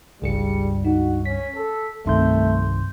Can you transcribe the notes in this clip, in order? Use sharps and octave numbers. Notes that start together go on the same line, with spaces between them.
G1 C#2 G2 F3 G3 G#4 C#7
D#4 F#4
C#4 B6
A4
C2 G2 D#3 A3 C4 C6 G6